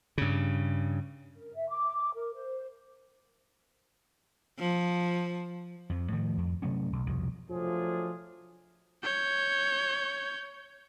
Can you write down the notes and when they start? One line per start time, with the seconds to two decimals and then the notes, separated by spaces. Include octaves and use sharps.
0.18 G2 C#3
1.35 A#4
1.55 E5
1.70 D6
2.15 A#4
2.34 C5
4.59 F3
5.90 F2 F3
6.12 A2 D#3 F3
6.37 F2
6.62 C3 F#3 A3 C#4
6.93 B1
7.06 C2 F2 B2
7.50 F3 F#3 A3 D4 F4 G#4
9.03 C#5 G6